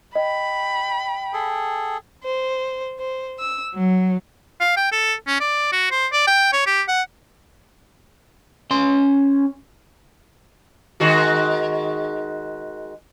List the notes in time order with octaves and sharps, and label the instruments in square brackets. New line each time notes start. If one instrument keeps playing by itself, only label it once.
[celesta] D#5 [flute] G5 [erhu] B5
[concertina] G#4 A4
[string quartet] C5
C5
E6
F#3
[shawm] F5
G5
A4
C#4
D5
F#4
C5
D5
G5
C#5
G4
F#5
[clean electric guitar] C#4 C6
[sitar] D#3 G#3 F#4